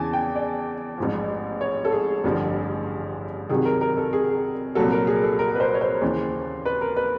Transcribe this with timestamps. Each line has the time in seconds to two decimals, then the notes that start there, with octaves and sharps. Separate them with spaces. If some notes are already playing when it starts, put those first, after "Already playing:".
Already playing: E2 C#3 E3 G#5 A5
0.13 G5
0.35 D5
0.98 A1 G#2 F3
1.61 C#5
1.85 A4
1.92 G#4
2.24 A1 G2 D3 F3
3.49 C2 C3 D#3 F#3 G#4
3.65 A#4
3.81 A#4
3.97 A4
4.13 G#4
4.75 C2 A#2 F#3 A4
4.92 A#4
5.07 G#4
5.23 A4
5.39 A#4
5.55 B4
5.60 C5
5.74 C#5
5.81 C5
6.01 D#2 C#3 E3
6.65 B4
6.81 A#4
6.97 B4